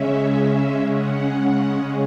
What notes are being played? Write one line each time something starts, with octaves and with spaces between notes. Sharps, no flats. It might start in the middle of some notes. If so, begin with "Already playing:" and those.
Already playing: C#3 G#3 C#4 E5
F#5